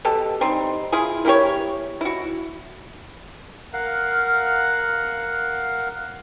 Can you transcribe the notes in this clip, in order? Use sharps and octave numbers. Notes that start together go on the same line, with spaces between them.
B2 G4 A4
G3 C4 D#4
E4 F4 G#4
A#3 E4 G4 C#5
E4 F#4
A#4 F5 F#5